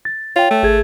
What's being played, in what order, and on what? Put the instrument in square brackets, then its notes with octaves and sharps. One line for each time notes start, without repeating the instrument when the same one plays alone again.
[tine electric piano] A6
[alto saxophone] F4 [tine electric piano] C#5 G5
[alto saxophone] A3
[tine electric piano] G#1 G#4 G#6